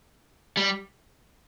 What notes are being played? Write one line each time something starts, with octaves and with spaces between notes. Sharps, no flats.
G3